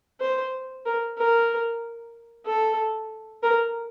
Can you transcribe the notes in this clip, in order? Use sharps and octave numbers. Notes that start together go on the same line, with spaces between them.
C5
A#4
A#4
A4
A#4